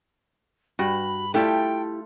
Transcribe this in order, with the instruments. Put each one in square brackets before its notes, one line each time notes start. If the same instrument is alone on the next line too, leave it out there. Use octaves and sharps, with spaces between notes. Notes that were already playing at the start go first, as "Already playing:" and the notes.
[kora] G2 [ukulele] F#4 [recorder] B5
[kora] A3 F4 [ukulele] E4 G4 A4 [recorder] G5